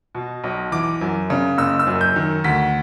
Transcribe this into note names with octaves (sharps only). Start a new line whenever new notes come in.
B2
B1
E3 D6
F#2
C#3
F#1 E6
E6
F#2
G6
D#3
D2 B6